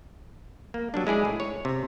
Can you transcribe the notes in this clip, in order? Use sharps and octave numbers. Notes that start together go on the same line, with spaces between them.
A#3
F#3 G3 D4
G#3 E4 G#4 D5
A2
C#5
C3